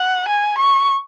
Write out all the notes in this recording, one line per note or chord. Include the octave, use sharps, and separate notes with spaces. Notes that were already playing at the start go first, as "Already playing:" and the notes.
Already playing: F#5
G#5
C#6